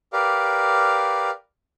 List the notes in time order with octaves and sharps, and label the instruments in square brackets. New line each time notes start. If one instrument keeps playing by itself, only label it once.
[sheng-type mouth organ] G4 A#4 B4 D5 F5